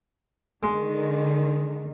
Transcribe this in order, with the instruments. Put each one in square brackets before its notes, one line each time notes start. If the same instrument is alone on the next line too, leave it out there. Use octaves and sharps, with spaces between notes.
[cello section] D3 D#3 [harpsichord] G#3